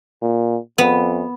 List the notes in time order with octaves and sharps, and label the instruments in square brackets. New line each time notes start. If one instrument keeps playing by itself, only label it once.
[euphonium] A#2
[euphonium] F2 [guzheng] B3